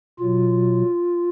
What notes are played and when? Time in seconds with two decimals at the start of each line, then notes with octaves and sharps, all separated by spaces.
0.19 B2 F#3 F4